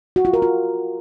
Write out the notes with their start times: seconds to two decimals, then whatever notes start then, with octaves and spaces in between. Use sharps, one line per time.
0.16 F#4
0.25 F4
0.33 A#4
0.42 F4